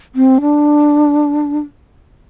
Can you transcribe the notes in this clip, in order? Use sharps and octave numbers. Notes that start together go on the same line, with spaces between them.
C4
D4